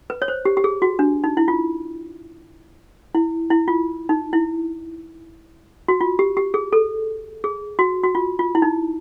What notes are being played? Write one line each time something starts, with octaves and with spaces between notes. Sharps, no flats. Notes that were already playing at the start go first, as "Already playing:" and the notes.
B4
C#5
C5
G4
G4
G#4
F#4
D4
D#4
E4
F4
E4
E4
F4
D#4
E4
F#4
F4
G4
G4
G#4
A4
G#4
F#4
F#4
F4
F4
E4
D#4